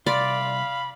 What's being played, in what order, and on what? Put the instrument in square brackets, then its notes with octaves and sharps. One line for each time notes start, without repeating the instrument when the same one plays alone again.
[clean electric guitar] C2 C6 [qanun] D5 [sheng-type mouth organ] F5 [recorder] B5